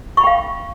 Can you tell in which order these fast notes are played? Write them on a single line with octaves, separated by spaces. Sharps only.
C#6 B5 G5 F5